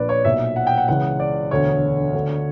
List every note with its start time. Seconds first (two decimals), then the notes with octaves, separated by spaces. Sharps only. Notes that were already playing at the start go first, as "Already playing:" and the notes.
Already playing: A#1 A#2 B4 D5
0.09 C#5
0.25 B1 A#2 E5
0.56 F#5
0.67 G5
0.77 F#5
0.88 C#2 C#3 E3 F#5
1.20 D5
1.51 E1 D2 D3 C#5
2.14 D2 D3